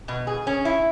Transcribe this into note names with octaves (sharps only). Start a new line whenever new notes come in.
B2
G#4
C#4
E4